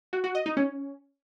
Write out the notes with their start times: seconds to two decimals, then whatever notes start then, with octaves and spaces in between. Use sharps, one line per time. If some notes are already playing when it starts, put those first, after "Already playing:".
0.13 F#4
0.24 F#4
0.35 D#5
0.46 D#4
0.57 C#4